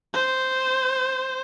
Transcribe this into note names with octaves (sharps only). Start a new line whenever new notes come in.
C5